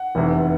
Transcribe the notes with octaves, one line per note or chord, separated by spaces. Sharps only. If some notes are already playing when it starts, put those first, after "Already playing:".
Already playing: F#5
F1 E2 C3 E3 A3